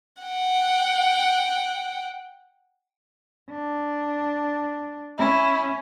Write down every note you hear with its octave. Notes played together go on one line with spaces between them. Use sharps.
F#5 G5
D4
C#4 E4